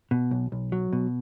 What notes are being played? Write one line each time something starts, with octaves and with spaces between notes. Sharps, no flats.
B2
B1
B1
F#3
B2